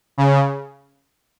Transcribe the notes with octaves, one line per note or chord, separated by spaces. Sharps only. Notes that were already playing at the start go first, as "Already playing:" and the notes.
C#3